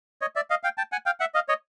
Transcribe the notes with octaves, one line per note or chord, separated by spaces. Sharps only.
C#5 D#5
D5 E5
D#5 F5
F5 G5
G5 A5
F#5 G#5
F5 G5
E5 F#5
D#5 F5
C#5 D#5